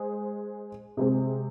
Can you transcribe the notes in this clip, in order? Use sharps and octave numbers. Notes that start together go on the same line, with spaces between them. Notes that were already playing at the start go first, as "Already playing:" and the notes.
Already playing: G#3 G#4 C5
C3 G#3 C4